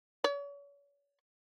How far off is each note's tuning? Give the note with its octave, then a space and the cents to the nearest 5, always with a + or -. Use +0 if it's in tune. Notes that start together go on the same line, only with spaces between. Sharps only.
C#5 +40